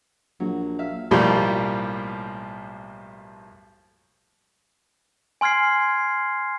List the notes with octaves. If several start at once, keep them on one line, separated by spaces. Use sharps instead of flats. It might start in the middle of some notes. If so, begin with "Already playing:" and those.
A#1 F#3
E5 F5
B1 A2 F3 G3 A#3 F4
G#5 C6 F6 G#6 C7